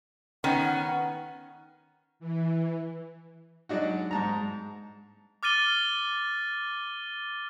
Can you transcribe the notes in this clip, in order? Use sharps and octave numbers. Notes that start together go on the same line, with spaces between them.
D#3 B3 C#4 G5
F#5
E3
F#3 G#3 D4 D#4 F#4
G#2 A5 A#5
D6 F6 A6 D#7 G7